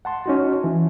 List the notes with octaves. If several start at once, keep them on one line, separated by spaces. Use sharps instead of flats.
F#5 A5 C6
C#4 D#4 F#4
E3